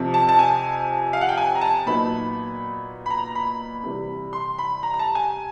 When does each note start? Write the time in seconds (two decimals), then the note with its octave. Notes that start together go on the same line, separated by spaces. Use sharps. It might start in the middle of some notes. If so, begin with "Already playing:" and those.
Already playing: F2 C3 F3
0.14 A5
0.29 A5
0.39 G#5
1.13 F5
1.21 F#5
1.29 G5
1.37 G#5
1.55 A#5
1.61 A5
1.86 A#2 F#3 B3 D#4 B5
3.06 B5
3.10 A#5
3.35 B5
3.83 C3 E3 G3
4.33 C6
4.58 B5
4.83 A#5
4.94 A#5
4.99 A5
5.15 G#5